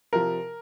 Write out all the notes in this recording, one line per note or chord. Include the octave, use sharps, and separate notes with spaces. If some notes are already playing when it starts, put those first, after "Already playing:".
C3 F3 A#4